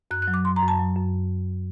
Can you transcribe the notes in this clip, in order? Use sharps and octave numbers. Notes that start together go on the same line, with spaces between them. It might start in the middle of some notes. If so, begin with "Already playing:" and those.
F#2 F#6
F#6
F#3
D6
F#2 C6
A#5
F#2
A5
F#3
F#2